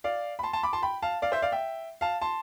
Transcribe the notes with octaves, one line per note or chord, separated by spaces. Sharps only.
D5 F5
B5
A5 C6
A5 C6
B5 D6
A5 C6
G5 B5
F5 A5
D5 F5
C5 E5
D5 F5
E5 G5
F5 A5
A5 C6